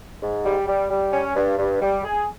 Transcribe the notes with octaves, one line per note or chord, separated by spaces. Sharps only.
G#2
G3
G3
G3
C#4
G2
G2
G3
G#4